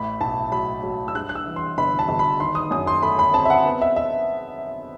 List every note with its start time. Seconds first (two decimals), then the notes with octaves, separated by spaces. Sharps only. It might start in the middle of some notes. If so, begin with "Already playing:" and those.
Already playing: A1 A2 B5
0.21 B1 A5
0.52 F#3 B5
0.83 F#3
1.08 E6
1.14 G2 F#6
1.29 F#6
1.35 E6
1.46 E3
1.56 C6
1.78 G1 B5
1.99 A5
2.09 G1
2.19 B5
2.40 D#3 C6
2.55 D#6
2.71 F#2 D#6
2.87 C6
3.03 A3 B5
3.19 B5
3.34 C4 A5
3.45 E5
3.50 F#5
3.66 B3
3.81 E5
3.96 E5